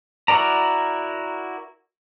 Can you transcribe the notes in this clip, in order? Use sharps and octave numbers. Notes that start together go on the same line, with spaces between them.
E4 F#4 A#4 D5 A#5